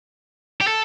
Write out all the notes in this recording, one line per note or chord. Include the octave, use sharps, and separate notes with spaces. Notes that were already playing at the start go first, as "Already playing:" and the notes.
G4
A4